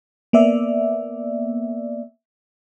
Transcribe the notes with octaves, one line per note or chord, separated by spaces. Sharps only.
A#3 B3 D5 E5